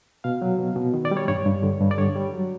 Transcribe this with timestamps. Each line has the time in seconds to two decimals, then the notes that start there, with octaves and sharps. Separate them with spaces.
0.24 B2 F5
0.42 F#3
0.59 B2
0.76 B2
0.94 D#3
1.05 D5
1.11 G3
1.17 C#5
1.28 G2 C#5
1.46 G2
1.63 D3
1.81 G2
1.91 D5
1.98 D3 C#5
2.15 G3
2.33 F#3